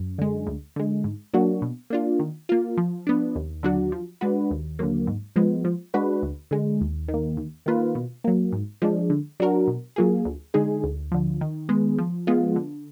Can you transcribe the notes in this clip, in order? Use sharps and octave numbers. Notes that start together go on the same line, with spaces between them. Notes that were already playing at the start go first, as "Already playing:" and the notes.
Already playing: F#2
D3 G#3
D2
D3 G#3
G#2
F#3 A#3 D4 F#4
B2
A#3 D4 F4
D#3
A#3 F4
F3
B3 D4
D#2
D3 F#3 D4 F#4
F3
G#3 D4 F#4 B4
D#2
D3 F#3 A#3
G#2
F3 G#3 B3
F3
G#3 D4 F#4 B4
D2
D3 G#3
D#2
D#3
A#3
D#2
D#3 A#3 F4 B4
B2
F#3 A#3
G#2
F3 G#3 D4
D3
F#3 D4 F#4 A#4
B2
F#3 A#3 F4 G#4
D2
D3 G#3 D#4 G#4
D2
D3 F3
D#3
G#3 B3
F3
G#3 B3 F4
D3